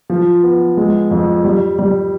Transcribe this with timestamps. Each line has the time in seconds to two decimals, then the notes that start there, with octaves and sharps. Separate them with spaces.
0.10 F3
0.43 B3
0.77 G#3
1.11 F2
1.44 G3
1.79 G3